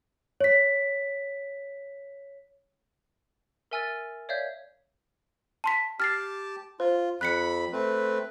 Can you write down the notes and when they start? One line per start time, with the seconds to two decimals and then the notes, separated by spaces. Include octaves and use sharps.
0.40 C#5 B6
3.71 A#4 E5 G#5 E6 F6 A6
4.29 C#5 D5 E5 F5 G6
5.64 A5 C6 B6
6.00 G4 A5 F6 A6 C7
6.80 F4 C5
7.21 F2 B5 F#6 B6 C#7
7.72 A3 C4 B4